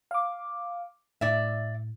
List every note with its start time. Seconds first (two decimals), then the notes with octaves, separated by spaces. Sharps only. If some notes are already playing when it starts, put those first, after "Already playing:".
0.11 F5 D6
1.21 A2 D5 E5